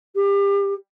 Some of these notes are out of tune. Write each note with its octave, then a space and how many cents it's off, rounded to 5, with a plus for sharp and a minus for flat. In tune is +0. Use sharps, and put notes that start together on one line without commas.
G4 +30